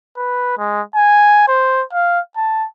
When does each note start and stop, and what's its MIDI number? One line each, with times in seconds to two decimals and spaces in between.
0.17 0.56 71
0.58 0.81 56
0.95 1.47 80
1.48 1.83 72
1.93 2.19 77
2.36 2.66 81